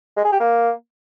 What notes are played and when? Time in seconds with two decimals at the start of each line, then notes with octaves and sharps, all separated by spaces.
0.17 G#3
0.24 G#4
0.32 G4
0.40 A#3